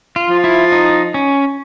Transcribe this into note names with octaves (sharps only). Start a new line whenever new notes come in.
F4
F3
E4
D#4
C#4